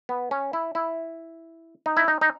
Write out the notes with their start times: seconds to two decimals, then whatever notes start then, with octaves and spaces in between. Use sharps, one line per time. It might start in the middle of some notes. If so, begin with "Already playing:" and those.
0.09 B3
0.31 C#4
0.53 E4
0.75 E4
1.86 D#4
1.97 E4
2.08 D#4
2.21 D#4